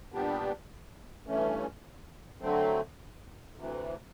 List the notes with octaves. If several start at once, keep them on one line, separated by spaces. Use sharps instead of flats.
A#2 G3 B3 D4 G4
G2 E3 A3 C#4
D3 F#3 A3 C4
D2 C3 E3